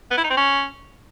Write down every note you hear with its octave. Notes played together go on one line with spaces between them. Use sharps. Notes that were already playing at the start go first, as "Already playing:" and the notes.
B3
E4
D#4
C4
C#4